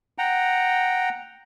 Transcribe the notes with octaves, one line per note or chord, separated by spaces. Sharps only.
F#5 G5 A#5